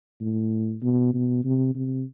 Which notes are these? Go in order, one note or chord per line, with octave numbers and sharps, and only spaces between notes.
A2
B2
B2
C3
C3